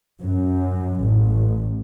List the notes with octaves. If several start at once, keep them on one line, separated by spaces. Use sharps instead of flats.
F#2
A1